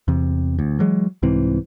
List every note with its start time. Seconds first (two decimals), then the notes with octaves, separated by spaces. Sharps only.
0.08 E2 C3
0.59 D2
0.79 E3 F#3 G#3
1.23 C2 G#2 E3 C4